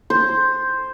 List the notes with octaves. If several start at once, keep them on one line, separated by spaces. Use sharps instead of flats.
C5